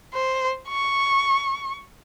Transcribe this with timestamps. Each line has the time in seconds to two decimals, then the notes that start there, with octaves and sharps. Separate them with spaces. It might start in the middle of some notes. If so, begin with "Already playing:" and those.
0.14 C5
0.68 C#6